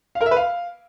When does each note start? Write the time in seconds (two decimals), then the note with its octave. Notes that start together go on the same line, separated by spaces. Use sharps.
0.15 F5
0.21 A#4
0.26 E5
0.31 B4
0.37 F5